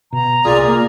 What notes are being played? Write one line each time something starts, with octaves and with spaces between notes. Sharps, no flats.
B2 A#5
C2 A#2 F4 G#4 D5
A#3